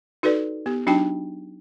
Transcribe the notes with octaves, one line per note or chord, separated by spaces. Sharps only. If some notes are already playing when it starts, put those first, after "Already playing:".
D#4 F#4 A4 B4 D5
B3 G4
F#3 D4 D#4 F#4 G5 A5